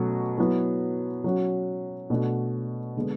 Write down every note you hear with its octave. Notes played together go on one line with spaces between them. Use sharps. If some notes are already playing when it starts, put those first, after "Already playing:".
Already playing: B2 F#3 A3 C#4
F#3 B3 E4
F#3 C#4 F#4
B2 A3 D4 F#4
D3 G#3 B3